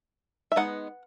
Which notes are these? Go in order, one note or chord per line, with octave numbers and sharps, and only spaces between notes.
E5
G#3 B3 D#4 F#5